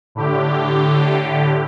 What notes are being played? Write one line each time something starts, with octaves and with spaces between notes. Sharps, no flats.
A2 D3 G4